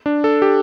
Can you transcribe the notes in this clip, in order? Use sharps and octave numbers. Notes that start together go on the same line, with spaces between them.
D4
A4
G4